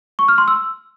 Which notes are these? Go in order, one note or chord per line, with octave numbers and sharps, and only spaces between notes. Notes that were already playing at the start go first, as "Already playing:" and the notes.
C#6
F6
C6
E6